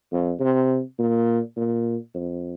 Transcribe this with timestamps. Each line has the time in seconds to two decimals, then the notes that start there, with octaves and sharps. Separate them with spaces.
0.12 F2
0.40 C3
0.99 A#2
1.56 A#2
2.15 F2